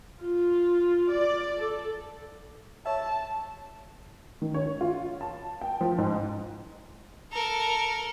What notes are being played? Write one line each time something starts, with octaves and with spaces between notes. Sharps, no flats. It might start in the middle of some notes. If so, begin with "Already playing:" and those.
F4
D5
A4
C#5 E5 A5
D#3
C#5
F4
A5
G5
F3
G#2
A4 A#4